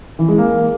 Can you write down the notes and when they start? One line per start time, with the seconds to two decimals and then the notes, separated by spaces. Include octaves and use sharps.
0.19 E3
0.28 G#3
0.38 A#3